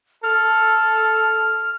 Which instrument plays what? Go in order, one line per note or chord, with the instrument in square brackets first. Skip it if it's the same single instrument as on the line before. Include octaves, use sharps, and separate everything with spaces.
[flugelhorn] A4 [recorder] F6